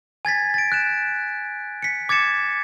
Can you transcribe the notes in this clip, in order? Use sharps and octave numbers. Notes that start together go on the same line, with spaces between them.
G#5 G#6 A6 B6
A6 D7
F#6 D7 E7
B6 C#7
D6 G#6 A6 C#7 E7